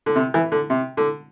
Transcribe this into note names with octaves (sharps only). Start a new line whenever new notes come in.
D3
C3
E3
D3
C3
D3